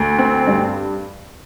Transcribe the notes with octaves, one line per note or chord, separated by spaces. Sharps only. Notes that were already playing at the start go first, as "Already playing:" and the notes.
Already playing: D2
C4
G2